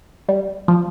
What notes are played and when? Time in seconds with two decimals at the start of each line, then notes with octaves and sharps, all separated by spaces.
0.29 G3
0.68 F3